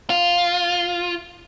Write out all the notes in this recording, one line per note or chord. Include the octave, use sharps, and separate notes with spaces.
F4